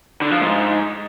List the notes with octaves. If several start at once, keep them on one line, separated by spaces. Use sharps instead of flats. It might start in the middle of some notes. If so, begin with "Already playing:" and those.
D3
F3
G#2